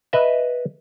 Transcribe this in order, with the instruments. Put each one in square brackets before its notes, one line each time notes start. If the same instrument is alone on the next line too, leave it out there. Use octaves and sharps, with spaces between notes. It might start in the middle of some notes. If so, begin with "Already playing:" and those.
[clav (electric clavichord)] B4 D#5 E5